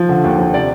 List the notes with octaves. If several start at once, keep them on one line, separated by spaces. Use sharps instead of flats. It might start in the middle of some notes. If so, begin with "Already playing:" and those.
Already playing: F3
D3
D#2
F3
C3 D5